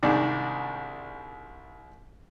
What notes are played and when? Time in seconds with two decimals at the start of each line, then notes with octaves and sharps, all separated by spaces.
0.03 C2 G#2 D#3 D4